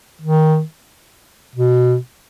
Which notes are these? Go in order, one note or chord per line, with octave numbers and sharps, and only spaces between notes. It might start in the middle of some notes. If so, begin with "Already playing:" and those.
D#3
B2